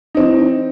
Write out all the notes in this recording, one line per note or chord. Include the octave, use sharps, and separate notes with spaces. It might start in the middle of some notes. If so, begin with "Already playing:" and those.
E3 C4 D#4